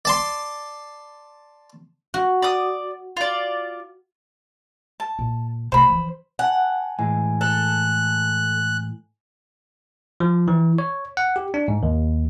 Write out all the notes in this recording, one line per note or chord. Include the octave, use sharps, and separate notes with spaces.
D5 A5 C6
F#4
D5 D#6
F4 D5
A5
A#2
C3 A3 C5 B5
E3 F3
F#5 G#5 A5
A2 E3 G#3 G#5
A4 F#6
F3
E3
C#5
F#5
G4
D4
G#2
D#2